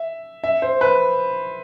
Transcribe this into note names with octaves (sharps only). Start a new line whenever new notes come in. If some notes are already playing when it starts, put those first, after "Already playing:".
Already playing: E5
E5
C5
B4